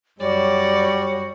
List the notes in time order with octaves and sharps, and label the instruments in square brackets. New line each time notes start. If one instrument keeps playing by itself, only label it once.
[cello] F#2 F#4 [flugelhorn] G3 [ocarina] C#5 [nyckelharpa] D5